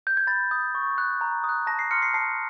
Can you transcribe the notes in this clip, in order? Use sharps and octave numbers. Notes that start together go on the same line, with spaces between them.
G6
G#6
B5 A6
D#6 G6
C#6
F#6
A#5
D#6
F#6
A5 A#6
C7
C6 F6 C#7
C7
A5 C7